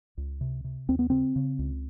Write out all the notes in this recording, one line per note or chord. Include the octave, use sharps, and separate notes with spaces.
C#2
C3
C3
D#2 C4
B3
C#3 C4
C#3
C#2